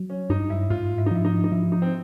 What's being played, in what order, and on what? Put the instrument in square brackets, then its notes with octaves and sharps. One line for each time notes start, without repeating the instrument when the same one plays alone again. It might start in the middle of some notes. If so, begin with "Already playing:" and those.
Already playing: [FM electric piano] F#3
[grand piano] C#4
[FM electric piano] G2 [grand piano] D#4
[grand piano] E4
[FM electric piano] G#2 [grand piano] F4
[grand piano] E4
D#4
[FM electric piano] F3 [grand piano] E4
[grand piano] D#4
D#4
[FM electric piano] F3 [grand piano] E4
[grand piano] D#4
C4